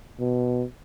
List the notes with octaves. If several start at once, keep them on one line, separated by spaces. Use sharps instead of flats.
B2